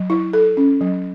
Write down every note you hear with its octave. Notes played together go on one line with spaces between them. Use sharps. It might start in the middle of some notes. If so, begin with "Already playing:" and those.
Already playing: F#3
E4
A4
C#4
F#3